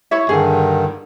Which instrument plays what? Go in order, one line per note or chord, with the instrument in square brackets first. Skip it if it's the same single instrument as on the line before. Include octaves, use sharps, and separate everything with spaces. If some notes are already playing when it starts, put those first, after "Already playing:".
[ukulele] E4 C#5 E5
[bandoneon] G2 D3 D#3 [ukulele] G#4